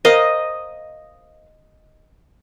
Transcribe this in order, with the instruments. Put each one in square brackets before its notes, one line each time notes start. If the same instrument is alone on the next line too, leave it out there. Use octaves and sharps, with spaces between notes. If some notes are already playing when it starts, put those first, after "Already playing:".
[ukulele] A#4 C5 F5 [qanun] D#5